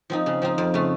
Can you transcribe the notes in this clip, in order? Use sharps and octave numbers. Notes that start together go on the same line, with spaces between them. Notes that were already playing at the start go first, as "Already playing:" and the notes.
F3 C4 D#4
C#3
F3 C4 D#4
F2
C#3 A3